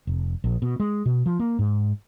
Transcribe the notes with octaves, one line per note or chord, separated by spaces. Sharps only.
F1
A#1
B2
G#3
B2
F3
A#3
G#2